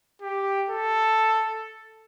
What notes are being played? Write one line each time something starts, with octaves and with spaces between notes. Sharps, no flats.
G4
A4